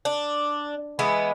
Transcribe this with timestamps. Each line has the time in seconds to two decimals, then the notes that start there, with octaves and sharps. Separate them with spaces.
0.05 D4
0.99 E3 G#3 B3 E4